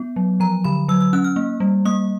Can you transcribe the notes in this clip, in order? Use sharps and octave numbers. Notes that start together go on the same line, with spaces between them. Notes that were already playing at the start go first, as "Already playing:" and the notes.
Already playing: B3
F#3
F3 A#5
D3 B5
F#3 E6
E6
C#4 F#6
F6
A#3
G3
A#3 D#6